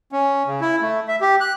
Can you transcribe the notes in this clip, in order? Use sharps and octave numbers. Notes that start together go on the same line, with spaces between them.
C#4
C#3
E4
A3
E5
G4
F#6